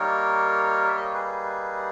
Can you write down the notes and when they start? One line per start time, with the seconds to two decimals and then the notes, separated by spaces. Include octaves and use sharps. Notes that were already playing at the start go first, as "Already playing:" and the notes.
Already playing: G3 A#3 D#4 A#4 C#5
0.89 E5
0.96 D#5
1.05 C#5
1.14 G#4 B4